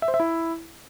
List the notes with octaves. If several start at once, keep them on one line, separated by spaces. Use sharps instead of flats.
E5
C5
E5
E4